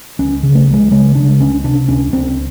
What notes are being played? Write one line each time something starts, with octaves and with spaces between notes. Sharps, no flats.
C#2 C#4
C#3
A3
C#2
G#3
C#3 G#3
C#3 D4
C#2 C#4
C3 D4
C#2 C#4
C#2 C4